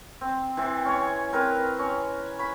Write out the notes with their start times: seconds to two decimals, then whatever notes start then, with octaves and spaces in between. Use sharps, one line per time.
0.21 C4
0.57 E3 C4
0.85 C#4 C#5
1.32 C4 A#4 B4
1.79 C#4
2.39 C#5 B5